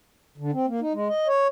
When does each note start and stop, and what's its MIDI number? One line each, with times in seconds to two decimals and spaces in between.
0.38 0.51 50
0.53 0.66 60
0.68 0.80 58
0.81 0.93 63
0.94 1.08 56
1.08 1.27 75
1.28 1.47 73